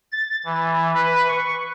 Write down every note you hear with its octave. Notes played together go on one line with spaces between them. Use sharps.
A6
E3
B4
C#6